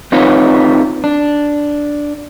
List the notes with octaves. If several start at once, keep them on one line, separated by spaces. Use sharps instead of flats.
C4 D#4 F4 B4 C#5
D4